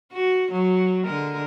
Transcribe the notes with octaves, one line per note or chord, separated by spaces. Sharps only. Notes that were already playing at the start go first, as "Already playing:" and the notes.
F#4
F#3
D3 G#3 A#4